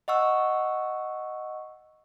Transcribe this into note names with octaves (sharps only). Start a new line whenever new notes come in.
D#5 F#5 C#6 E6